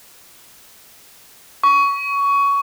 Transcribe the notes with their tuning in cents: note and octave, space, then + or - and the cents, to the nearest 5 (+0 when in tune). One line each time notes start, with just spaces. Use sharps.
C#6 +20